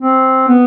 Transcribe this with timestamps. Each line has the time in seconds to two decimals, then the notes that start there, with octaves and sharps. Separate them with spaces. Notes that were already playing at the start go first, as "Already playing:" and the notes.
0.01 C4
0.48 B3